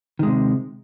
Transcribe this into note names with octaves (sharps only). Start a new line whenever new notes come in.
C3 D#3 G#3